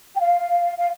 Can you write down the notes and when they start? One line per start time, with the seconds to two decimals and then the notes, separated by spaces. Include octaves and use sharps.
0.15 G5
0.20 F5
0.77 F5